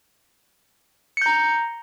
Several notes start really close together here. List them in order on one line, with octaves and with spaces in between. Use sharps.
C#7 G6 A#5